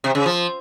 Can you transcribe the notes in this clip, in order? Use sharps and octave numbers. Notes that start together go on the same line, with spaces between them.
C3
C#3
F3